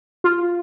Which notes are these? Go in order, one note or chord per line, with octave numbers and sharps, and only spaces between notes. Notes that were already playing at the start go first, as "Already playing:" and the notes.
F4